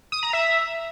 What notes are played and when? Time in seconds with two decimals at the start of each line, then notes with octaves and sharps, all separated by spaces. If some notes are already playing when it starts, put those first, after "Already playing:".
0.12 D#6
0.23 A#5
0.33 E5